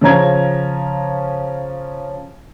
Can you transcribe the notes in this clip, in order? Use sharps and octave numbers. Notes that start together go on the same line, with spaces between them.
C#3 F3 C#4 A#5 G#6